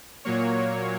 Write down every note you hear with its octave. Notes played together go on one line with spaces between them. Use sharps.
A#2 F#3 A#3 C#5